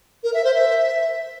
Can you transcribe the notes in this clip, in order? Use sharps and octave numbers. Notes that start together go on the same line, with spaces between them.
A#4
E5
C5
E5